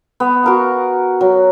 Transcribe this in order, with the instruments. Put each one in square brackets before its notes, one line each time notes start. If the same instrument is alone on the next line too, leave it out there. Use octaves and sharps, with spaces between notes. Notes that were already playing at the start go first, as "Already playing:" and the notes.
[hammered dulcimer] B3
F#4 A#4 F5
F#3